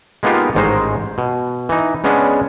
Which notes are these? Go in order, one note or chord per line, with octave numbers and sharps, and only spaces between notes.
G#3 A#3 B3 D#4 F4 G4
A1 G#2 D#3 G#3 D#4 C5
B2
E3 D#4
C#3 G#3 B3 C#4 D4